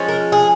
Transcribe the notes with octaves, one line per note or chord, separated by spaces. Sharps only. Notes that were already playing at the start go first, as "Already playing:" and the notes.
Already playing: F3 G#3 C#4
A#4
G#4